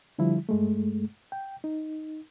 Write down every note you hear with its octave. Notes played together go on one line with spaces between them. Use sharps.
D3 F3 G3 E4
G2 G#3 A3
G5
D#4